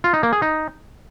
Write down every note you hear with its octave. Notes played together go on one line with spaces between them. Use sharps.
F4
D#4
A#3
G#4
D#4